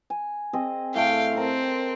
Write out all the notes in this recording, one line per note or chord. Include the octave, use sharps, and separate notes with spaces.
G#5
C4 G#4 D#5
A2 A3 F5 G5
C4 A4 A#4